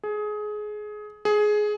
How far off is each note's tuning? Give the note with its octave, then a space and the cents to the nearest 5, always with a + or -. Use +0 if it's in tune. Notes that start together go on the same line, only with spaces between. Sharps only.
G#4 +20
G#4 +15